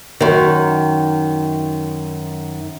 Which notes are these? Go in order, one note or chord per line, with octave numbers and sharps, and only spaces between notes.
F#2 D#3